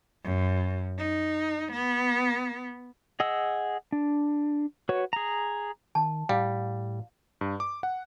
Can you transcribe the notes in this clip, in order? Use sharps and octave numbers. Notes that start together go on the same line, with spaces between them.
F#2
D#4
B3
G#4 D#5 F#5 E6
D4
F#4 B4 C#5
G#4 A#5
D#3 A5
A2 G3 F5
G2
D6
F#5